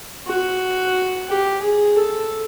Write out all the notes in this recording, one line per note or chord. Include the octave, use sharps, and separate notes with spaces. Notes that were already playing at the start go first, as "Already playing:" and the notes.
F#4
G4
G#4
A4